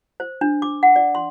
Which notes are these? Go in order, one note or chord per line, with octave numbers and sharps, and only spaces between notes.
C5
D4
D6
F#5
D5
C6